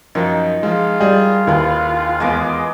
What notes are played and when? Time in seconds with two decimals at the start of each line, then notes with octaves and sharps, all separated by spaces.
0.15 F#2 D#3 F3
0.63 F3 G#3 F4
1.00 G3 G#4 D#5 G5
1.47 D#2 D#3 E4 G#4 B4
2.20 E2 G#3 B3 D#5 D6